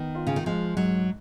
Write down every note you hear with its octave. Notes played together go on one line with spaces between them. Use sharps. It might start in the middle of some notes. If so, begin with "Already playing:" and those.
Already playing: D#3 B3
F4
C#3
D#3
F3 G#3
G#2 F#3